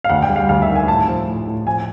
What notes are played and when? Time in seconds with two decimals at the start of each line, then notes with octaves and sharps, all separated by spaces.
0.04 F5
0.09 D2 F#5
0.23 G5
0.29 G3
0.36 F5
0.49 D2 F5
0.62 E5
0.68 D#3
0.75 G#5
0.88 A2 A5
1.07 F3
1.27 A2
1.47 A2
1.67 F3 G#5